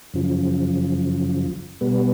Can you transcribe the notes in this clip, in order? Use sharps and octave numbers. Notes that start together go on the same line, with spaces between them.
F#2 C#3 F3
B2 G3 B3